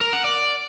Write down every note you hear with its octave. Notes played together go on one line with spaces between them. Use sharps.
A#4
F#5
D5